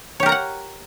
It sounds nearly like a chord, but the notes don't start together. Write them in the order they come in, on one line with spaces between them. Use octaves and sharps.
C#5 G4 A#4 A#5 F#5